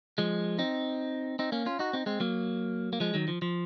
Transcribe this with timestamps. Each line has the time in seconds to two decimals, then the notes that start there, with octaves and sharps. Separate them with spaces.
0.18 F3 G#3
0.59 C4 D#4
1.39 C4 D#4
1.52 A#3 C#4
1.66 C#4 F4
1.79 D#4 F#4
1.93 C4 D#4
2.06 G#3 C4
2.20 F#3 A#3
2.93 A#3
3.00 F3 G#3
3.14 D#3 F#3
3.28 F3
3.42 F3